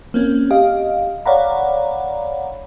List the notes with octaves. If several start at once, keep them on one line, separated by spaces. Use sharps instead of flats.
A#3 C4 C#4
G4 D#5 F5
C#5 D5 F5 F#5 A#5 B5